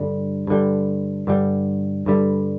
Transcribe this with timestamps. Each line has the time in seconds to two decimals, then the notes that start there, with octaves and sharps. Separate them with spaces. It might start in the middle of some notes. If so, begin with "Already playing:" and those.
Already playing: G2 D3 G3
0.47 G2 D3 G3
1.27 G2 D3 G3
2.06 G2 D3 G3